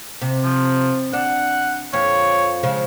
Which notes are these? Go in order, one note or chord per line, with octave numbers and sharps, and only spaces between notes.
C3
F3
D4 F#5
F2 C#5
C#3 F3 G#3